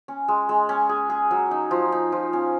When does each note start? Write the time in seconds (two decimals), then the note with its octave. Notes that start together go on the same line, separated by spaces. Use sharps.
0.08 C#4
0.28 G#3
0.49 G#3
0.69 C#4
0.89 G#4
1.10 G#4
1.31 F#3
1.51 D#4
1.71 F3
1.92 D#4
2.12 F3
2.33 C#4